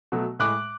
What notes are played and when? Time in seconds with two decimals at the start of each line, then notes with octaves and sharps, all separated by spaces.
0.12 B2 F#3 A3
0.39 A2 G#3 D6 F#6